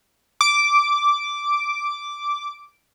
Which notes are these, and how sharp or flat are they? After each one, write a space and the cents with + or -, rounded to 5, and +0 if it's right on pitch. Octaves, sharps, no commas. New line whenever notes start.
D6 -5